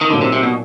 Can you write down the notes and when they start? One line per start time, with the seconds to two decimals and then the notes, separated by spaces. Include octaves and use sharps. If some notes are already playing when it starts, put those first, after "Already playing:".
0.01 D#3
0.10 A#2 D3 F#3 A#3 D#4
0.21 C3
0.33 C3
0.43 B2